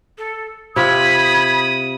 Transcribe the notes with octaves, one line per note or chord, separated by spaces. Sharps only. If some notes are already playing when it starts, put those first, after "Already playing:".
A4
C3 F4 B5 D#6 G#6